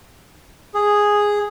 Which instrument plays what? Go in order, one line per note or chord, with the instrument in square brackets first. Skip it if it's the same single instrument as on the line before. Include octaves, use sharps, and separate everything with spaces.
[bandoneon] G#4